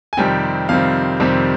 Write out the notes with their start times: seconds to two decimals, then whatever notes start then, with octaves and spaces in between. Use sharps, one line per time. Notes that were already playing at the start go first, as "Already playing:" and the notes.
0.13 G#5
0.17 F2 C3 D#3 G3 C4 G5
0.69 F2 C3 D#3 G3 C4 F5
1.20 F2 C3 D#3 G3 C4